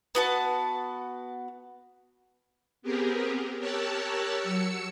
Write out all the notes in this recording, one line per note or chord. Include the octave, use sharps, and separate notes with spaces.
B3 F#4 A5
B3 C4 G4 G#4 A#4
G4 A#4 C#5 A5 E6 F#6
F#3 E6 C#7